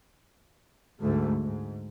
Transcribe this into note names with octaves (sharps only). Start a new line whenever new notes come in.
D2 G#2 A3
G#2